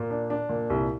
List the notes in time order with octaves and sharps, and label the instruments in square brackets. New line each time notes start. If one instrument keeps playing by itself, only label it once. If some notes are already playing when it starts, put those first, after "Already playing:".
Already playing: [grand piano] A#2
D4
D4
A#2
C2